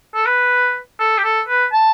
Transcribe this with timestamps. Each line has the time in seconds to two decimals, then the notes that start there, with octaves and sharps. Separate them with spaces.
0.15 A4
0.26 B4
0.99 A4
1.18 G4
1.24 A4
1.48 B4
1.73 A5